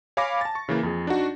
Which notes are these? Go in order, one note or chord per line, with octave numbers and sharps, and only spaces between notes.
C#5 F5 G#5 B5 D6 A#6
A5 A6
C#6
C#3 E3 A#3
F2 G#4
D4 D#4 F#4